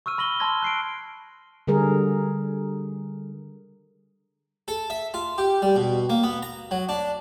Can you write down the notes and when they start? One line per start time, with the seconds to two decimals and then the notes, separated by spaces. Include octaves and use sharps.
0.06 C#6 E6 F6 D#7
0.18 B5 A#6 F#7 G7
0.40 A5 C6 F6 G#6 A#6
0.62 F#6 C7 D7
1.67 D3 G3 G#4 A#4
4.68 A4
4.90 E5
5.14 F4
5.38 G4
5.62 G3
5.76 B2
6.10 A#3
6.23 B3
6.43 A#5
6.71 F#3
6.89 D4